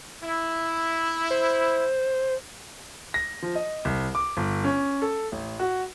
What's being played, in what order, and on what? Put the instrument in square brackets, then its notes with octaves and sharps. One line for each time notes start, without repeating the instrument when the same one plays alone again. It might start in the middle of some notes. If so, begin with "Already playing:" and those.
[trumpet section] E4
[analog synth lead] C5
[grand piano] A#6
F3
D#5
C2
D6
G1
C#4
A4
A1
F#4